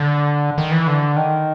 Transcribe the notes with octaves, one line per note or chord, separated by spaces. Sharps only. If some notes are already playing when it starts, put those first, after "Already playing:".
Already playing: D3
D#3
E3
D3
D#3